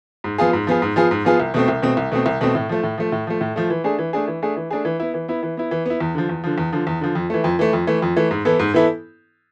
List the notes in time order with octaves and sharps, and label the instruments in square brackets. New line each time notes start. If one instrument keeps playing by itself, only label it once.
[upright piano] G#2
F3 B3 F4 G#4
G#2
F3 B3 F4 G#4
G#2
F3 B3 F4 G#4
G#2
F3 B3 F4 G#4
C2
B2 A3 C4
C2
B2 A3 C4
C2
B2 A3 C4
C2
B2 A3 C4
A2
F3 A3
A2
F3 A3
A2
F3 A3
A2
F3 A3
E3
A3 D4 G#4
E3
A3 D4 G#4
E3
A3 D4 G#4
E3
A3 D4 G#4
E3
B3 E4
E3
B3 E4
E3
B3 E4
E3
B3 E4
E2
D3 F3
E2
D3 F3
E2
D3 F3
E2
D3 F3
F2
E3 A3
F2
E3 A3
F2
E3 A3
F2
E3 A3
G#2
E3 B3 E4 A4
G#2
E3 B3 E4 A4